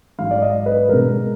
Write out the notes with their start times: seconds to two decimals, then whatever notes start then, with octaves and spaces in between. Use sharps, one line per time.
0.18 G#2 F#3 F5
0.31 D5
0.42 D#5
0.66 B4
0.89 B2 G#3 A#4